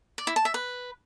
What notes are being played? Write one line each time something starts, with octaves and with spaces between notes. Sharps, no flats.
D5
E4
A5
E5
B4